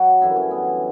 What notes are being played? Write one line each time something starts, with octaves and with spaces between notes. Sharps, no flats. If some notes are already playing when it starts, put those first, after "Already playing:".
Already playing: F#3 F#4
F#2 D3 E3 G3 E4
C#4
B3